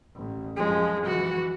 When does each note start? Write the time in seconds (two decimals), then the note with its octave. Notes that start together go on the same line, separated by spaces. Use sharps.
0.15 A1
0.57 F#2 F3 G#3
1.06 E3 F#4